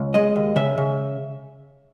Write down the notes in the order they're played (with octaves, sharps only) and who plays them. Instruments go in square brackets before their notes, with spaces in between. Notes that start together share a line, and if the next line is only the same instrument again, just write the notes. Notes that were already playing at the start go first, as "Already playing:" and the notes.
Already playing: [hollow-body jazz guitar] C#2
G#3 D#5
D#2
C#3 E5
C#3